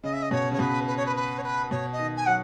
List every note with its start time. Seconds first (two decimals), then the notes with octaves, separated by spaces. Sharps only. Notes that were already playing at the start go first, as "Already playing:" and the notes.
0.03 C#3 D#5
0.13 E5
0.22 D#5
0.31 B2 C#5
0.51 C#3 C#5
0.59 B2 B4
0.87 B4
0.96 C#5
1.06 B4
1.16 B4
1.38 C#5
1.43 B4
1.71 B2 C#5
1.92 D#5
1.99 D#3
2.16 G#5
2.26 F#3 F#5